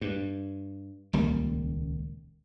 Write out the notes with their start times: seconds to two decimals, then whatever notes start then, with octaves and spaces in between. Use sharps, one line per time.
0.01 G2
1.13 D#1 C#2 G3 A#3